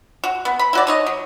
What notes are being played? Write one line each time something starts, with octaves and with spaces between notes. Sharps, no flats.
F#4
B3
B5
E4 F#4 D5
D#4 C#5 D#5
F#3